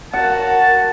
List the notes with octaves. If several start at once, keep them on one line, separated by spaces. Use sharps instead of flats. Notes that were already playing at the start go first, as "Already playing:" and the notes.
F#4 A#4 F#5 A5